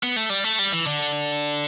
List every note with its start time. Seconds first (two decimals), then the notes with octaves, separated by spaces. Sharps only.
0.03 B3
0.16 A3
0.30 G3
0.44 A3
0.59 G3
0.72 E3
0.87 D3